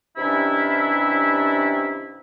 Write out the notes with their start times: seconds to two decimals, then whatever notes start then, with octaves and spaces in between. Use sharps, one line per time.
0.17 G2 C3 D#3 C#4 D4 E4